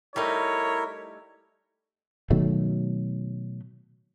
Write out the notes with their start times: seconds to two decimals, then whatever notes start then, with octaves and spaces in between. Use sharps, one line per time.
0.16 G3 A3 D#4 E4 A#4 C#5
2.30 B2 D#3 F#3 A3